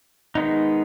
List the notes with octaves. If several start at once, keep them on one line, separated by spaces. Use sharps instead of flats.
D#3 G#3 B3 D#4